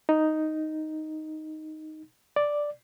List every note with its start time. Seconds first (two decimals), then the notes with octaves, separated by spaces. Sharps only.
0.09 D#4
2.36 D5